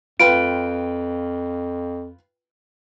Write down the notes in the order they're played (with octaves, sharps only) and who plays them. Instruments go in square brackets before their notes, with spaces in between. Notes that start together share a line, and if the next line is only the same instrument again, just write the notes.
[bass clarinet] F2 [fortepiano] F4 B4 G5 [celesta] D7